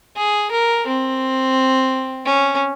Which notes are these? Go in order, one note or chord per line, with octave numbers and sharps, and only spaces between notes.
G#4
A#4
C4
C#4